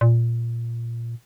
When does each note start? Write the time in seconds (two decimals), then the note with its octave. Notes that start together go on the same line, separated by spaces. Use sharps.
0.01 A#2